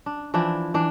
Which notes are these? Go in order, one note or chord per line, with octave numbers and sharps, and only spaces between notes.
D4
E3 F3 D4 E4
E3 D4